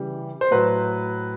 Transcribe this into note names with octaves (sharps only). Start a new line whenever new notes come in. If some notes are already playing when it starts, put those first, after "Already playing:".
Already playing: C#3 E3 G3
C5
A2 F#3 B4